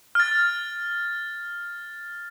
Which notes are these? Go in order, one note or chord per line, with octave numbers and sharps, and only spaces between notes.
F6 A6